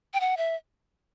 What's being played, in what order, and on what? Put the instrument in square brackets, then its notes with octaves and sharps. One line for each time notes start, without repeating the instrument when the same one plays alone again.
[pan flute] G5
F#5
E5